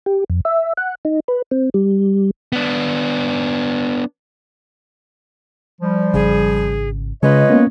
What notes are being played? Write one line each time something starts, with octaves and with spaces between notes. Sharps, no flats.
G4
F2
E5
F#5
D#4
B4
C4
G3
B3 D4
F3 G3
G#1 C#3 G#4
C#3 G#3 F4 B4 C#5 D#5
A#3 B3 C#4